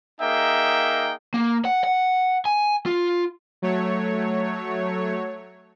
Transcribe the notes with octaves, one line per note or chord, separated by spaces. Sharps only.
A#3 D#4 G#4 E5 G5
A#3
F#5
F#5
G#5
F4
F#3 A3 C#5